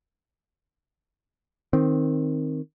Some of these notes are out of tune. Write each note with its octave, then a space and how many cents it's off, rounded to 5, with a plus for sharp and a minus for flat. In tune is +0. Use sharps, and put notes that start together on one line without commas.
D#3 +0 C4 +5